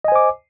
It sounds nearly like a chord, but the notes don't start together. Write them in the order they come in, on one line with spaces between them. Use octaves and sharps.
D#5 G#5 C5 D6